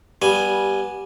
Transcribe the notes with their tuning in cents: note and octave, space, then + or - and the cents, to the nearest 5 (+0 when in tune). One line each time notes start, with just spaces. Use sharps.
G3 +0 B3 -20 G#5 +0